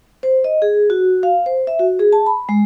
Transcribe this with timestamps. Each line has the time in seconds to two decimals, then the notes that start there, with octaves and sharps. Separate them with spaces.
0.23 C5
0.44 D#5
0.62 G#4
0.90 F#4
1.23 F5
1.46 C5
1.67 E5
1.79 F#4
1.99 G#4
2.13 A5
2.26 B5
2.49 G#3